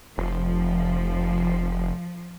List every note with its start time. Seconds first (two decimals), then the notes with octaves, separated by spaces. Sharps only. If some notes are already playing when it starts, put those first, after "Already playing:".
0.18 F1 F3